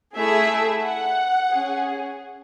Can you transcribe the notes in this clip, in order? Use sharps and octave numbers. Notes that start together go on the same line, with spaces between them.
A3 E4 G#4 E5
F#5
C#4 G#4